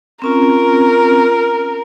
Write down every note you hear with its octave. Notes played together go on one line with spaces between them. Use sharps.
C4 C#4 F4 A#4